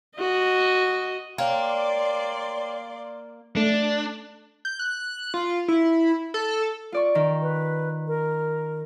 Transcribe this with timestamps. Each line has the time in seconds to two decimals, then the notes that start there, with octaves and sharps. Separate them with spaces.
0.18 F#4 D#5
1.38 A#3 C#5 D5 G5 C6
3.56 A3 D4
4.65 G6
4.79 F#6
5.34 F4
5.68 E4
6.34 A4
6.92 F4 D5 C#6
7.15 D#3
7.42 B4
8.07 A#4